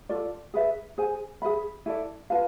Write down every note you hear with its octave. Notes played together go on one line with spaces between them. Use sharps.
F4 A4 D5
G#4 B4 E5
G#4 C5 G#5
G#4 B4 E5 B5
E4 A4 D5
F4 B4 F5 A5